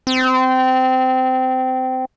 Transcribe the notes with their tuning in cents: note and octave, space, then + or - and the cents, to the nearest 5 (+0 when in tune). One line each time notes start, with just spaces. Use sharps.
C4 -20